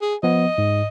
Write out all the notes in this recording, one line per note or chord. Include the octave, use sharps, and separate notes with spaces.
G#4
F3 B3 D#5
G#2